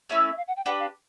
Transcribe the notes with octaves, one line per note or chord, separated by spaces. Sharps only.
A3 C#4 E4 E5
E5
F5
F#5
G5
D4 G4 B4 F#5
F5